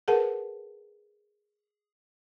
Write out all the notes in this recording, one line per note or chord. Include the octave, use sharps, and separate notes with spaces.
G#4 A#4 B4 F#5 A5